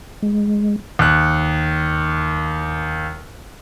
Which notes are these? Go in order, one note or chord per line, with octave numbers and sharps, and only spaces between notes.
G#3
D#2 F#6